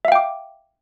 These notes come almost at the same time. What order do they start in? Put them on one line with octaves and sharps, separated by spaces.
E5 F5 G5 D6